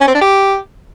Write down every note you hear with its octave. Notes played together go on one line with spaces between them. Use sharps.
C#4
C4
D4
G4